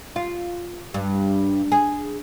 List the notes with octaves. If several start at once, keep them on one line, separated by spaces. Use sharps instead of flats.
F4
G2
G#4